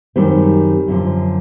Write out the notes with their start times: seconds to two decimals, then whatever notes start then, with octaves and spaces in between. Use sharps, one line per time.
0.16 F#2 D#3 G3 C4
0.88 F#2 D3 F3